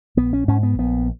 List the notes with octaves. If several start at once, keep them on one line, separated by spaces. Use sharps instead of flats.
A#1 B3
C#4
G#2 C#4
B3
A#1 B3